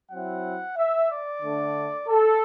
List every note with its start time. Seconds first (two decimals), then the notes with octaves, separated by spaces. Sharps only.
0.11 F#3 C4 E4 F#5
0.77 E5
1.10 D5
1.42 D3 A3 D4
2.09 A4